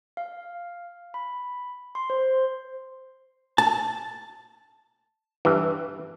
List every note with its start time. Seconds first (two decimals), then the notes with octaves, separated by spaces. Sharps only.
0.17 F5
1.14 B5
1.95 C6
2.10 C5
3.58 A5
5.45 G2 E3